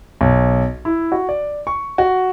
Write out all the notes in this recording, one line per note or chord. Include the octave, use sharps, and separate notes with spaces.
B1
E4
F#4
D5
C#6
F#4